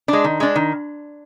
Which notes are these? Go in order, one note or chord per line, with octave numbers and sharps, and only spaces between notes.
G#3 D4
D#3
G#3 D4
D#3